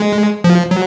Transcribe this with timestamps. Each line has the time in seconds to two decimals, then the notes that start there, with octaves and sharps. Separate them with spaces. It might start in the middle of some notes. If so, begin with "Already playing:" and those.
Already playing: G#3
0.44 F3
0.71 F#3